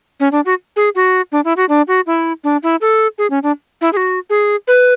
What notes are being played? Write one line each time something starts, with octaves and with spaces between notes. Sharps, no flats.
C#4
D4
F#4
G#4
F#4
D4
E4
F#4
D4
F#4
E4
D4
E4
A4
G#4
C#4
D4
E4
G#4
F#4
G#4
B4